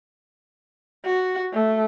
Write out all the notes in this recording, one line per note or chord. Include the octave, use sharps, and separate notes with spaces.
F#4
A3